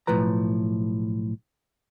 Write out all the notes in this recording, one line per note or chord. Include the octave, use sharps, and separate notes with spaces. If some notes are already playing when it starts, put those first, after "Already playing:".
B1 A2 F3 B4 A#5